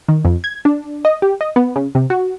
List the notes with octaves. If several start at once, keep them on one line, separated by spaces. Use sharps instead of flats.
D#3
F2
G#6
D4
D#5
G4
D#5
B3
C#3
C3
F#4